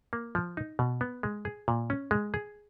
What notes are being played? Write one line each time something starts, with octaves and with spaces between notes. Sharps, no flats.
A#3
F3
D#4
B2
B3
G#3
G#4
A#2
C#4
G#3
G#4